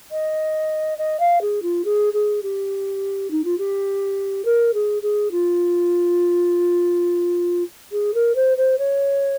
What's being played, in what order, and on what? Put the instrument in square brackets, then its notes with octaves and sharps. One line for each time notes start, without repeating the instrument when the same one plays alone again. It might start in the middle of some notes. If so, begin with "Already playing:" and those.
[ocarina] D#5
D#5
F5
G#4
F4
G#4
G#4
G4
D#4
F4
G4
A#4
G#4
G#4
F4
G#4
A#4
C5
C5
C#5